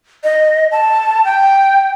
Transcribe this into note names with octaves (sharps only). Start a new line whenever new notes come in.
D#5
A5
G5